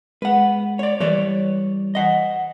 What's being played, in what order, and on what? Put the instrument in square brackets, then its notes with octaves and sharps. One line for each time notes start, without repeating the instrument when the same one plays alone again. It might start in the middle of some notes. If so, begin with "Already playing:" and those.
[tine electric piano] G#3 [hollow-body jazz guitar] B4 F#5
[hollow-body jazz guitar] C#5 D5
[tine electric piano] E3 G3 [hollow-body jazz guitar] B4 C#5 D5
[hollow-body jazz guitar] D#5 F#5